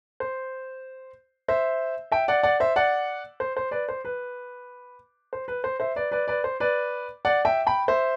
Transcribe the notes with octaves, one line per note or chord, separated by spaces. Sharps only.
C5
C5 E5
E5 G5
D5 F#5
D5 F#5
C5 E5
D5 F#5
C5
C5
B4 D5
C5
B4
C5
B4
C5
C5 E5
B4 D5
B4 D5
B4 D5
C5
B4 D5
D5 F#5
E5 G5
G5 B5
C5 E5